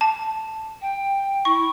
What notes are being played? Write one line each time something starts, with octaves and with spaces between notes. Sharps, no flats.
A5
G5
E4 C#6